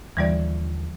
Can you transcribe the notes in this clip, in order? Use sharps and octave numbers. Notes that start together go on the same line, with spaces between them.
D#2 D3 E3 F3 G3 D5